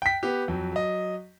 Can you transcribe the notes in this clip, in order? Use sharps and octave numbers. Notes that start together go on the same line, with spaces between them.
G5 B6
B3 G4
F2 F#3
F#3 D#5